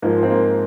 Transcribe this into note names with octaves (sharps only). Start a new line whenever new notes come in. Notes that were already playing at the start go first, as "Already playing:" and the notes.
G#2 F3 A#3
C4
A#3